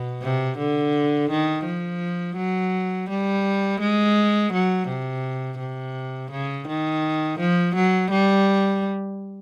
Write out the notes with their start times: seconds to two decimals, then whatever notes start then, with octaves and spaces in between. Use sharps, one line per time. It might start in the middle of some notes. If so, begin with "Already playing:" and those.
Already playing: B2
0.22 C3
0.58 D3
1.30 D#3
1.66 F3
2.37 F#3
3.09 G3
3.80 G#3
4.53 F#3
4.89 C3
5.59 C3
6.31 C#3
6.68 D#3
7.39 F3
7.75 F#3
8.10 G3